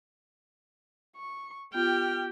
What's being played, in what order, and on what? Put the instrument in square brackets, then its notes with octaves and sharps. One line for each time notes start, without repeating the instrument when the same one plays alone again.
[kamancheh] C#6
[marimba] B3 F4 [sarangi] G4 [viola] G5 [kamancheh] F6